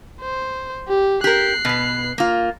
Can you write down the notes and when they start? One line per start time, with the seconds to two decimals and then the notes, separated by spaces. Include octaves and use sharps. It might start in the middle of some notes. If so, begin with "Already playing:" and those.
0.21 C5
0.88 G4
1.24 G4 A#4 F#6 C7
1.65 B2 B3
2.18 A#3 F4